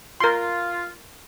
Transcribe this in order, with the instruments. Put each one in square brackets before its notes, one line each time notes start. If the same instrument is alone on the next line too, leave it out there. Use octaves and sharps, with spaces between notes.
[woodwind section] F4 [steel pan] A#4 C6